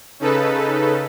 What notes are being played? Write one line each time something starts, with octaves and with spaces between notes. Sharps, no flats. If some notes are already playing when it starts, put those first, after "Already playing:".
C#3 D#4 A4 B4